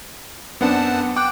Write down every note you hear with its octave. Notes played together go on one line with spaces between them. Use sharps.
F#2 B3 C4 D4 F#5 A5
G5 D6 F#6